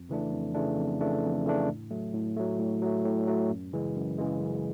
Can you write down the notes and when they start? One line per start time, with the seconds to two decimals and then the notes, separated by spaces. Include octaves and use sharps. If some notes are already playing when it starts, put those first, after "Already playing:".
Already playing: F2
0.09 C#3 E3 A3 D4
0.32 F2
0.55 C#3 E3 A3 D4
0.77 F2
1.00 C#3 E3 A3 D4
1.23 F2
1.45 C#3 E3 A3 D4
1.68 A2
1.91 F#3 A3
2.14 A2
2.36 F#3 A3
2.59 A2
2.82 F#3 A3
3.05 A2
3.27 F#3 A3
3.50 F#2
3.73 C#3 E3 G#3
3.96 F#2
4.18 C#3 E3 G#3
4.41 F#2